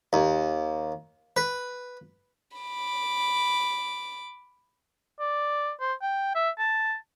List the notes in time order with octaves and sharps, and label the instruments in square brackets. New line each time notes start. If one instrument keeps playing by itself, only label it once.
[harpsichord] D#2
B4
[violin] B5 D6
[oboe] D5
C5
G5
E5
A5